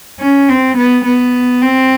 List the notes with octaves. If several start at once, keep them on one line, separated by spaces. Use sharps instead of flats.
C#4
C4
B3
B3
C4